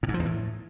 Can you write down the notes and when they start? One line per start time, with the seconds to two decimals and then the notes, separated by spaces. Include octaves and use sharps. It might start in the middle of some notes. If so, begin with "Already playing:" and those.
0.03 A2
0.09 G#2
0.14 F3
0.20 E2
0.25 A2